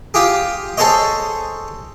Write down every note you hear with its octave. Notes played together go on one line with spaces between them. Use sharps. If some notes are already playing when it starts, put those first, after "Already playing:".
F4 G4 G#4
G#4 A4 C5 C#5 D#5